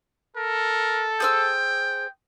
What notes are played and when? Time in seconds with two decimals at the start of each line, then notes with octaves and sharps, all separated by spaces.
0.36 A4 A#4
1.20 G#4 C5 G5 E6